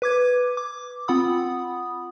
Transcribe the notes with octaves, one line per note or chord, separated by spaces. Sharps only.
B4 D6 G#6
D6
C4 F4 F#5 B5 D#6